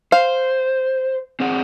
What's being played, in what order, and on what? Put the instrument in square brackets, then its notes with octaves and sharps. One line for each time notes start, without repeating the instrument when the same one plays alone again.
[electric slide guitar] C5 [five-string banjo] F5
[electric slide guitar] C4 G#4 F#5